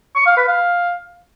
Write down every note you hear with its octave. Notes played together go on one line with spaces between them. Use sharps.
C#6
F5
B4
F5